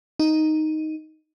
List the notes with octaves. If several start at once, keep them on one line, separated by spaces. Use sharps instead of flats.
D#4